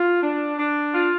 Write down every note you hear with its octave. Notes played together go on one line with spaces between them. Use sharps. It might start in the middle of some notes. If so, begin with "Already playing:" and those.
Already playing: F4
D4
D4
F4